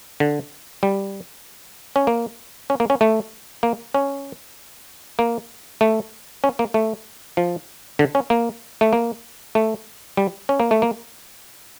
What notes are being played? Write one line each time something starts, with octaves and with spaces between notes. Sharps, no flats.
D3
G3
C#4
A#3
C#4
A#3
C#4
A3
A#3
C#4
A#3
A3
C#4
A#3
A3
F3
D3
C#4
A#3
A3
A#3
A3
G3
C#4
A#3
A3
A#3